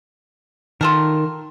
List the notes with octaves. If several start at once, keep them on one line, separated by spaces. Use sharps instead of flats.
D#3 F4 A4 A#4